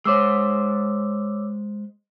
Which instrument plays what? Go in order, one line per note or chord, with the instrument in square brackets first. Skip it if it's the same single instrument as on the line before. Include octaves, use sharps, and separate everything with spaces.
[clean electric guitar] G#3 C5 [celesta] C#5 D6 E6